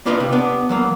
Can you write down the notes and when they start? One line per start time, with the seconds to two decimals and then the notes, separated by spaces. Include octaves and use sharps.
0.05 A#3 D4 F4 B4 D#5 F5
0.20 C3
0.32 B3 D4
0.69 E3 F#3 A#3